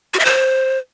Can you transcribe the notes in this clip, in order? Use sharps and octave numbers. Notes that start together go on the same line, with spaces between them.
F#4
E5
C5